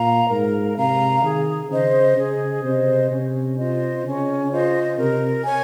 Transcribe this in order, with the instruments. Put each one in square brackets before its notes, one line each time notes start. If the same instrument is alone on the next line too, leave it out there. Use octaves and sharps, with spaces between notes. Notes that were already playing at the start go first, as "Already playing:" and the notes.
Already playing: [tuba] A#2 [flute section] F5 A#5
[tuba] G#2 [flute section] A#4
[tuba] C3 [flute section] F5 A#5
[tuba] D#3 [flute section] G#4
[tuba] C#3 [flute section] C5 D#5
[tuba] C#3 [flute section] G#4
[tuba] C3 [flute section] C5 D#5
[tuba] C3 [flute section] C#4
[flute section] F4 C5 D#5
[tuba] C#3 [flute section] C#4
[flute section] F4 C5 D#5
[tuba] C3 [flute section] A#4
[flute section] C#5 G#5